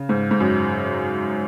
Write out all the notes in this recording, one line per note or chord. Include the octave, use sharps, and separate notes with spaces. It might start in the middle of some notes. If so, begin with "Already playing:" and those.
Already playing: C#3
G#2
G#2
F#2